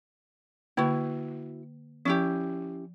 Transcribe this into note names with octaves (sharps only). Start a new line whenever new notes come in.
D3 A#3 E4 F#4
F3 C#4 E4 G4